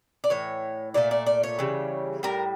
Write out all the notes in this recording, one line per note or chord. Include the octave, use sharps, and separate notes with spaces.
D5
A2 E3 C#5
A#2 A3 D5
D5
D5
C#5
C#3 E3 G3
A2 G3 A#4